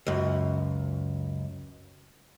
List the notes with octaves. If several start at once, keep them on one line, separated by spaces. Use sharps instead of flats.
C#2 F#2